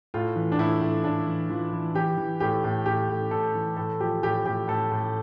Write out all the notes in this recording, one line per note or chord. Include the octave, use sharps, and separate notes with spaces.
A2 F4
E3
D4
A2 E4
A2
A2 D4
E3
E3 F4
E3
E3 G4
E3
A2 G4
A2
A2 G4
A2
A2 A4
E3
A2 A4
F3 G4
A2 G4
A2 G4
A2 A4
A2